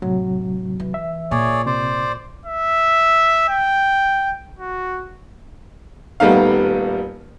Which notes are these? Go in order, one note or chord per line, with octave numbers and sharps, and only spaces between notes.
A2 C3 F#3
E3
E5
A#2 G#4 C#5 D5
C3 C5 D5
E5
G5
F#4
D#1 G3 A3 B3 D#4 F5